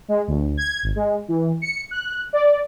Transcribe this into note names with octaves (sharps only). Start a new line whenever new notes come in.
G#3
D2
G#6
G#1
G#3
E3
C#7
F#6
D5